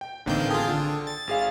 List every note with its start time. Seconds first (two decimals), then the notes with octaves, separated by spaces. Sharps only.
0.01 G5
0.26 A1 D3 D#3 A#3 C4 G6
0.50 F4 G#4 G5 A5 D#6
0.68 D3
1.07 A6
1.27 G#1 G#4 F5